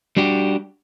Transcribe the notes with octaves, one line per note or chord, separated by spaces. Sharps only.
G3 D4 F#4 G4